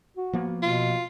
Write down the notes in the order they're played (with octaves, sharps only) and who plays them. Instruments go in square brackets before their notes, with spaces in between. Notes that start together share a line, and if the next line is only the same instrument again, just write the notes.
[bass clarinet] F#4
[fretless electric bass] F3 A#3 B3
[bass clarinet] B2 [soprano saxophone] F4